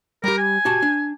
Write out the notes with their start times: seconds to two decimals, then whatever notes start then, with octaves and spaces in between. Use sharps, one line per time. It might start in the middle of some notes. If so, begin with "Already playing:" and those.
0.24 G3 G4 A#4
0.38 G#5
0.65 F#4 G4 A5
0.82 D4